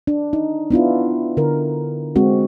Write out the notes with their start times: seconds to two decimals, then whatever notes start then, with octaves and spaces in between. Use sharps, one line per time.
0.07 D4
0.33 D#4
0.71 B3 D4 E4 F4
1.37 D3 A#4
2.16 G#3 C4 F#4